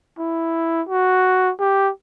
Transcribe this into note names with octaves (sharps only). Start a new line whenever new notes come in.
E4
F#4
G4